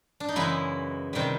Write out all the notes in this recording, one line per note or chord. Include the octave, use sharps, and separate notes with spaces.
D4
D#4
F#2 C#3 E3 G#3 B3 E4
C3 D#3 G3